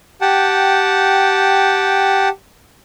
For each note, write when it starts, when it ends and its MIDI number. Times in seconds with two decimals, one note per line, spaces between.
0.21 2.29 67
0.21 2.29 78
0.21 2.29 79
0.21 2.29 81